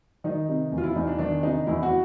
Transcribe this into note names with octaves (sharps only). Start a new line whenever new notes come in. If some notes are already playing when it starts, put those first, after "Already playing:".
D#3 D#4
C3
E2
F4
E4
E2 D#4
D4
D#3 D4
C3 D#4
E2 E4
F#4